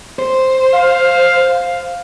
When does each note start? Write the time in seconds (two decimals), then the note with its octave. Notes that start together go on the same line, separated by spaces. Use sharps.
0.19 C5
0.74 F5